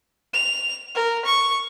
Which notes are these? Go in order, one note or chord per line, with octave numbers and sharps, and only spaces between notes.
F7
A#4
C#6